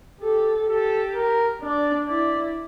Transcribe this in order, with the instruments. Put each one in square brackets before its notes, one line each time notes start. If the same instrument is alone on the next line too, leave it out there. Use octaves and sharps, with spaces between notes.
[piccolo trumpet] G4 [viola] A4
[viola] G4 [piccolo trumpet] A4
[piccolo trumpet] A#4
[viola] D4 [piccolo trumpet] D5
[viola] E4 [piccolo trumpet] D5